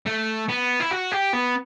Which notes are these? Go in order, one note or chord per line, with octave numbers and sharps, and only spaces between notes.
A3
B3
E4
F#4
G4
B3